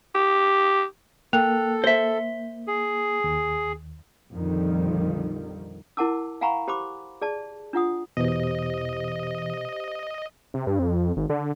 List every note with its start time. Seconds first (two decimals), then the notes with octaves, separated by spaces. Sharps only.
0.15 G4
1.33 A#3 A4 G5 F#6 F7
1.84 C5 E5 G7
2.67 G#4
3.24 D#2
4.32 A#1 F2 D3 D#3 F3 G3
5.97 E4 A#4 F#5 A5 D6 E6
6.41 F5 F#5 G#5 A#5 B5 C#6
6.68 G4 C5 B5 C6 D6
7.21 G#4 D5 A5
7.73 D4 F4 F#5 D#6
8.17 E2 B2 E3 G4 C5 D#5
10.54 C3
10.67 G2
10.79 F2
11.17 G#1
11.30 D3